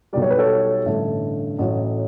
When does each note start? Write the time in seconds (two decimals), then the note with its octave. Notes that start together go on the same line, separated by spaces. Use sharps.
0.13 B1 B2 G3 D5
0.22 C#5
0.30 B4
0.39 A4 C#5
0.86 A1 G2 D3 A3
1.58 A1 A2 F#3